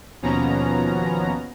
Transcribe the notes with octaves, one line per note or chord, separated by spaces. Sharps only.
D#2 B2 F3 B3 C#4 A#5